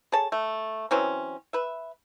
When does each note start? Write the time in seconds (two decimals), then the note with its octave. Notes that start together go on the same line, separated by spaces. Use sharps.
0.12 G#4 A4 C#5 A5
0.32 A3
0.91 E3 F#3 C4 C#4
1.53 B4 E5